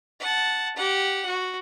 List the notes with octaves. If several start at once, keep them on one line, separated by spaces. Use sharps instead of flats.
F#5 A5
G4 F#5
F#4